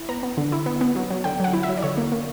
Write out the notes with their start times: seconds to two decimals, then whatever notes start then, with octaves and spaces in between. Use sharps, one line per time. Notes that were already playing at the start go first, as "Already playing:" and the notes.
Already playing: E4
0.09 B3 A#5
0.23 B3
0.37 D3
0.52 E4
0.66 B3
0.81 B3
0.96 F#3
1.10 F#3
1.24 D3 G5
1.40 F#3 F#5
1.53 E4
1.63 E5
1.69 F#3
1.77 D5
1.82 D3 C#5
1.98 A#3
2.12 A#3